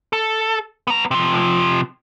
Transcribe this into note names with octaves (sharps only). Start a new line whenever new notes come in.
A4
B3 A#5
C3 F3